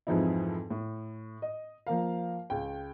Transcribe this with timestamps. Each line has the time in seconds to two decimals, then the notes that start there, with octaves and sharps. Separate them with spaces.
0.07 F2 G#2 E3 F3 D#4 E4
0.70 A2
1.42 D#5
1.87 F3 A#3 A#4 F5
2.50 C#2 G5